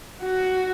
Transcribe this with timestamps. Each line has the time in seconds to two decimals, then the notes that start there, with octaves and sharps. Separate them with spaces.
0.23 F#4